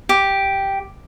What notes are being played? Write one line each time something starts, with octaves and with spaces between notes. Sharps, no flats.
G4